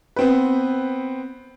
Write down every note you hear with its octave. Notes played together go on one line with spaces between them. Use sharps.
B3 C4 B4